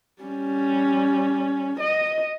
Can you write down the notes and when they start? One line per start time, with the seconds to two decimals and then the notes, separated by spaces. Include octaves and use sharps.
0.22 G3 C#4
1.80 D#5